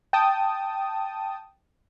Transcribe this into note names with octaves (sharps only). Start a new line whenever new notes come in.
G5 A5 D#6